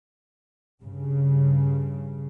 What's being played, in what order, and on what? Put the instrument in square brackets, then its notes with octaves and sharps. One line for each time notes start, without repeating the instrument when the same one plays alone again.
[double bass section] G2 C#3